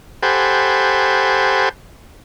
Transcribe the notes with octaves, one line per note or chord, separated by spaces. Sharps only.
G4 A4 C5 F#5 G#5 B5